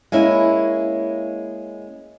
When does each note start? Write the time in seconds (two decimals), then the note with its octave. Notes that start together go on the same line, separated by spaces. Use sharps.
0.12 G#3 A#3 C#4 E4